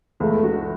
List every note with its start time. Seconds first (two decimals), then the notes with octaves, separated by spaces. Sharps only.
0.20 C#2 A3
0.43 F#4